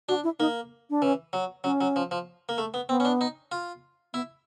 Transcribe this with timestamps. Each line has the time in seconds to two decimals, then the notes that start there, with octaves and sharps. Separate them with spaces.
0.09 D4 F#4
0.24 E4
0.40 A#3 D#4
0.90 D4
1.02 E3 C#4
1.33 F#3
1.64 F#3 C#4
1.81 F#3
1.96 F3
2.11 F3
2.49 A#3
2.58 A3
2.74 B3
2.89 B3 C4
3.00 C#4
3.05 D4
3.21 D#4
3.52 F4
4.13 B3 E4